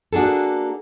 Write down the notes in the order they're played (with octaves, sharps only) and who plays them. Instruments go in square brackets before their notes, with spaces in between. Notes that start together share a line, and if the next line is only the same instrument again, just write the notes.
[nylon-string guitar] A#3 D4 F#4 G#4 A4